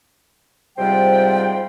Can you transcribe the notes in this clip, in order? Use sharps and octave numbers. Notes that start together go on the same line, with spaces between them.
G#2 C3 F3 G3 C5 G5